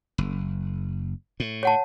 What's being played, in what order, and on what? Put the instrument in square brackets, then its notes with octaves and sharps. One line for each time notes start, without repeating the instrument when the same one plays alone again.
[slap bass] F#1
A2
[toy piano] C#5 F#5 A5